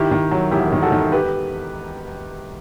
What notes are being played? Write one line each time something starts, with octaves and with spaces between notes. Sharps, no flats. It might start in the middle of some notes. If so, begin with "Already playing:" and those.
Already playing: D#3 E4 G4
D#3
F#3
E1 E4 G4
D#3
F#4 A4
D#3
G4 B4